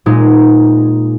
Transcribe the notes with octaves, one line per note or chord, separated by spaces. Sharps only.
A#2 G#3 D#4